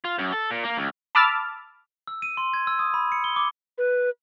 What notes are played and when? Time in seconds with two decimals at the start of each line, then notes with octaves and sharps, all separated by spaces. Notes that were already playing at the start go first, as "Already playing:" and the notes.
0.04 F4
0.19 F#2
0.33 A4
0.51 A#2
0.64 A#3
0.77 C#2
1.15 A5 B5 D6 E6 F6 A6
2.07 E6
2.22 D#7
2.37 C6
2.54 G#6
2.67 E6
2.79 D#6
2.94 B5
3.12 C#7
3.24 G7
3.36 D6
3.78 B4